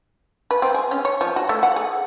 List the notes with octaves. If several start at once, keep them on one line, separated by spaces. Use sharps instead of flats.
B4
C4
G#4
C#4
C#5
F3
F#4
A3
F#5
G#4